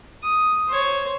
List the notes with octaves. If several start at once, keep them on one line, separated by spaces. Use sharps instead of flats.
D#6
C5 C#5